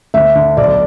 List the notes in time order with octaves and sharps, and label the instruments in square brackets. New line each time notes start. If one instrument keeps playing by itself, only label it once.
[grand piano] D2 [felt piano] E5
[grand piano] D3
[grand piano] B1 [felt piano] D5